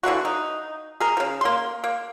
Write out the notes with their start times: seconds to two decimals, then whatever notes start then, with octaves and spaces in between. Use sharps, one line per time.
0.03 D3 E3 A#3 F#4
0.25 D#4
1.00 G#4 A#4
1.17 C#3 F3
1.41 A#3 C6
1.84 A#3